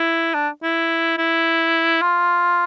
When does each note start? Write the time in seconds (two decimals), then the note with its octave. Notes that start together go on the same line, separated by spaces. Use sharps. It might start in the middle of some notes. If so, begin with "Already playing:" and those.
Already playing: E4
0.34 D4
0.63 E4
1.18 E4
2.02 F4